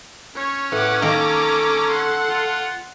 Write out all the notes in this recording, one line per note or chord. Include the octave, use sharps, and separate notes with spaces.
C#4 C#5
A2 B4 F#5 D6
D#3 A#3 A4 A#5 D6
F#5 C6
F4